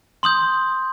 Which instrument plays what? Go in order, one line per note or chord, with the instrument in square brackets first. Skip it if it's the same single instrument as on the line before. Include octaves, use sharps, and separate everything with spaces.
[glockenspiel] C6 D#6 G6 F#7